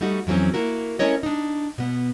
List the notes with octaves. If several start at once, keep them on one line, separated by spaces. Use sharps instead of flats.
G3 A3 D#4 F#4
F2 E3 F#3 C4 C#4
A#3 E4 F#4 A#4
A3 C#4 E4 A#4 C#5 D#5
D4 D#4
B2 B3